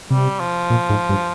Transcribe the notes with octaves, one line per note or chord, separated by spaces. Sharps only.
C3 G3
F3
A#2
G#2
G2